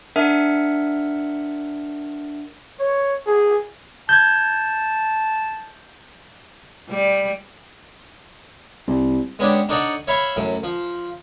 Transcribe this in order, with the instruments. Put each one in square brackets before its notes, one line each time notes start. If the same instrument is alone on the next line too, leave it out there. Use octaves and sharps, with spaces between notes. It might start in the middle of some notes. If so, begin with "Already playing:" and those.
[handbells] D4 A#4 E5 F#5
[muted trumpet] C#5
G#4
[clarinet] A5 [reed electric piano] G6 G#6
[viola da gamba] G3
[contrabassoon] C2
[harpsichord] G#3 B3 C#4 D4 G4
D4 D#4 A4 C#5 D5 F#5
C#5 E5 F5 B5
F#2 A2
F3